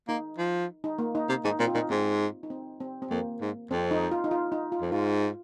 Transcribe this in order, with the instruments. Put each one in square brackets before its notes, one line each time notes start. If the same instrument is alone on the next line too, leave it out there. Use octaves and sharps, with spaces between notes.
[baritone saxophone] A#3 [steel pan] D#4
[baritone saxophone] F3
[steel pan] D#4
A#3
D#4
[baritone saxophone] C3
[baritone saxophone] G#2 [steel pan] D#4
[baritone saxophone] A#2 [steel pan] C4
[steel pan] F4
[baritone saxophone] A#2 [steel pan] D#4
[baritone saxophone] G#2 [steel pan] C4
[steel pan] D#4
C4
C4
C4
[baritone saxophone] F2 [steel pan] A#3
[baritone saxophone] G#2
[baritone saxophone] F2 [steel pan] C4
[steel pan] D#4
F4
D#4
F4
D#4
F4
[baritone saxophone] F2
[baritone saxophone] G#2 [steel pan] F4